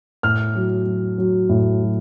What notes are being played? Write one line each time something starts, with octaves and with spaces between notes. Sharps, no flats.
A2 F6
F#3
F#3
F#3
A2
F#3